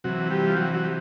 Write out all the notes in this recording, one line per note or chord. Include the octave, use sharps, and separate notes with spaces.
C3 E3 F#3 F#4
G3 G4
F4
F#3 F#4
F#3 F#4
G4